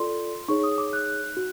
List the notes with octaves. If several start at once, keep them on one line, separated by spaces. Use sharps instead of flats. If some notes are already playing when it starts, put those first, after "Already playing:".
Already playing: F4 A4 D5 C6
D#4 G#4 C#5 C#6
D#6
D6
F#6
F#4